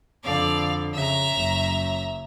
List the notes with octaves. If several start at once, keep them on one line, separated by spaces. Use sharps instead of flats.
F2 D3 D5 F5
C#3 E5 A#5
F#1 F#2